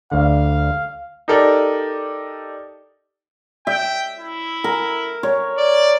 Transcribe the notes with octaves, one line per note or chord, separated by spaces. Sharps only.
D2 D3 F5
D#4 G4 A4 A#4 D5
E5 G5
E4
A#4
C#5
D5